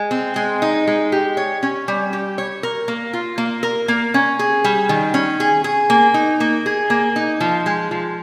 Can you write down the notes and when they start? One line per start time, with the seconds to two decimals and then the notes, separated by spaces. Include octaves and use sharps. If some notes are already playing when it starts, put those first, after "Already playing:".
Already playing: G#3
0.11 C4
0.36 G#3
0.62 D#4
0.87 G#3
1.12 G4
1.37 C#5
1.63 C#4
1.88 G3
2.13 G4
2.38 C#5
2.63 A#4
2.88 A#3
3.13 F4
3.38 A#3
3.63 A#4
3.88 A#3
4.14 C#4
4.39 G#4
4.64 G3
4.89 D#3
5.14 C#4
5.40 G#4
5.64 G#4
5.90 A#3
6.14 D#4
6.40 A#3
6.66 G#4
6.90 A#3
7.16 D#4
7.40 F3
7.66 G#3
7.91 F3